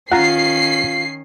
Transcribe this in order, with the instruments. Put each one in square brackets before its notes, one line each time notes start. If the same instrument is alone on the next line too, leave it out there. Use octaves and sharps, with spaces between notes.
[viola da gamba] D#3 C#4 [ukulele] F4 [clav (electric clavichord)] F#5 A#5 [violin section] C7